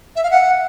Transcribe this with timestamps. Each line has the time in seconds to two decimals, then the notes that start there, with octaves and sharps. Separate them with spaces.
0.16 E5
0.23 F5
0.31 F#5